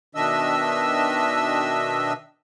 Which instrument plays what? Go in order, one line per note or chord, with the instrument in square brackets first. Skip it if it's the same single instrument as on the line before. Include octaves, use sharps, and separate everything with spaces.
[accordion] B2 D#3 D4 D#5 E5 E6